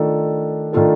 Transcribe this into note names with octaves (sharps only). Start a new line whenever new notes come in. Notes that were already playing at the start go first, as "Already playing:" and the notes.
Already playing: D#3 A3 D4 F4 A4
D#3 A3 D4 F4 A4